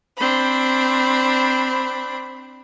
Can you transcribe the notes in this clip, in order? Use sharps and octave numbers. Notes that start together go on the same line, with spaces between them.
C4 D4 B5